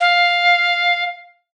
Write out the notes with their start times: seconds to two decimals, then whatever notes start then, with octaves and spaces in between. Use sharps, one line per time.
0.01 F5